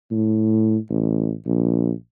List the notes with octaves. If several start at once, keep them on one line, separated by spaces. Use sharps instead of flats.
A2
A1
A#1